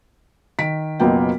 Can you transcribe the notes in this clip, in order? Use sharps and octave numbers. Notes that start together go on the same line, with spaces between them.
D#3 B6 D7
F#1 B1 A#3 B3 F4 G5